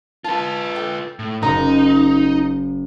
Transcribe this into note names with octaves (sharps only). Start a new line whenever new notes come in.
F4 B4 A5
A4 G5
A2
F#1 D#4 F#4 D#5 A#5